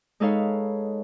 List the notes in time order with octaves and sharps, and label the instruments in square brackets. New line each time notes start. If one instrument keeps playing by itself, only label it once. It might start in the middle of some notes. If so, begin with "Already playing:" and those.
[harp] G#3 D#4 A4 B4 C#5 F5